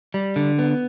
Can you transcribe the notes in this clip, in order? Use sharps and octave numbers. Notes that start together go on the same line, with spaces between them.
G3
D3
B3